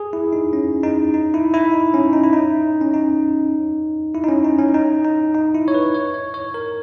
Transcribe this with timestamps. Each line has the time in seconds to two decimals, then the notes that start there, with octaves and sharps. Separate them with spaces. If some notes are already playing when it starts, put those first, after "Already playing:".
Already playing: G#4
0.13 E4
0.33 D#4
0.53 C#4
0.84 D#4
1.14 D#4
1.34 E4
1.54 E4
1.74 D#4
1.94 C#4
2.13 D#4
2.24 E4
2.33 D#4
2.81 C#4
2.94 D#4
4.14 E4
4.24 D#4
4.29 C#4
4.44 D#4
4.59 C#4
4.74 D#4
5.05 D#4
5.35 D#4
5.55 E4
5.68 C#5
5.74 B4
5.94 C#5
6.14 C#5
6.34 C#5
6.54 A#4